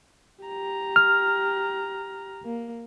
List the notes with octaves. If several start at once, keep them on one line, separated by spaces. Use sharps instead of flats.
G4 A#5
F6
A#3